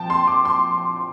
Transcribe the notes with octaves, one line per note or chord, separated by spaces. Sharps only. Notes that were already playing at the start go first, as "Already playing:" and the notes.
Already playing: A#2 F3 G5 A5
C6
D6
C6